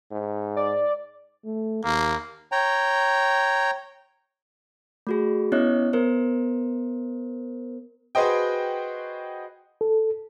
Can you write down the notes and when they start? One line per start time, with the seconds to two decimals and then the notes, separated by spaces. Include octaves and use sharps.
0.11 G#2
0.57 D5
1.45 A3
1.85 D#2 A#3
2.52 C#5 G5 A#5
5.07 A3 F#4 G#4
5.52 B3 C#4 E4 C#5 D#5 F#6
5.93 B3 A#4 C5
8.15 F#4 G#4 B4 C5 D#5 G5
9.81 A4